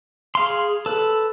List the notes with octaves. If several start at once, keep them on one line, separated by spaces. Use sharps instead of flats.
G#4 F5 C6
A4 B4